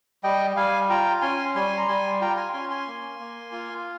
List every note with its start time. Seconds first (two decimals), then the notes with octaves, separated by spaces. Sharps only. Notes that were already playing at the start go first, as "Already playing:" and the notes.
0.24 G3 D#5 G5
0.56 G3 F5 G#5
0.89 F4 G5 A#5
1.22 C#4 G#5 C6
1.55 G3 G#5 C6
1.77 A#5
1.88 G3 G#5 C6
2.21 F4 G5 A#5
2.37 G#5 C6
2.53 C#4 G#5 C6
2.70 G#5 C6
2.87 A#3
3.19 A#3
3.52 F4